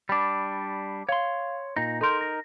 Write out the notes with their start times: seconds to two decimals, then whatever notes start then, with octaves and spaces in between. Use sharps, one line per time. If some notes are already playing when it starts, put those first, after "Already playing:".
0.09 G3 D4 B5 D6
1.09 C#5 F5 C6
1.76 A#2 D#4 A#6
2.01 D#4 A4 A#4 C6 G6
2.21 A#6